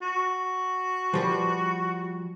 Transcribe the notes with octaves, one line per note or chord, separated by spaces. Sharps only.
F#4
F3 G3 B4